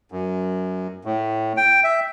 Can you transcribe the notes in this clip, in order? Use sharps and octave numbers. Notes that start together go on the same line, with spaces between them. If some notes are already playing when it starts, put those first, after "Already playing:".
F#2
A2
G5
E5